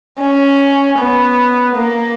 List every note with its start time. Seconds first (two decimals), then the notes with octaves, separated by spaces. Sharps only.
0.21 C#4
0.99 B3
1.76 A#3